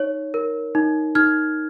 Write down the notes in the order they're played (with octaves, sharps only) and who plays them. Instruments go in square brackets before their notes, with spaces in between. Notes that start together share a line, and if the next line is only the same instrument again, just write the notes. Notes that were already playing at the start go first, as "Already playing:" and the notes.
Already playing: [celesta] D#4 C#5
A#4
D#4
D#4 F6 G#6